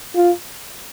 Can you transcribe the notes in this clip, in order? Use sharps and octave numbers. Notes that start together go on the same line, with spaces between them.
F4